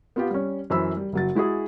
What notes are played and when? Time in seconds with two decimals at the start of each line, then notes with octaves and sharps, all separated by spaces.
0.16 B3 F4 G4
0.30 G3 C#4
0.70 F#2 E3 C5 B5 E6
0.97 G3
1.13 F#1 F#3 A6
1.35 G#3 E4 F#4 G#4